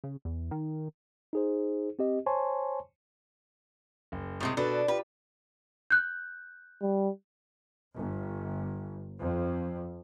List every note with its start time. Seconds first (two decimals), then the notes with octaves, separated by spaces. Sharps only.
0.04 C#3
0.25 E2
0.51 D#3
1.33 D#4 G#4 C5
1.99 C4 G4 D#5
2.26 C5 C#5 G#5 A5 C6 C#6
4.12 F#1
4.40 A2 C3 G#3
4.57 B2 D4 A4 B4
4.88 D4 F4 G4 B4
5.90 F#6 G6
6.82 G3
7.97 G1
9.19 F2